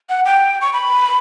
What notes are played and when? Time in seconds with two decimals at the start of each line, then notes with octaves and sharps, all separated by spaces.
0.09 F#5
0.25 G5
0.61 C#6
0.73 B5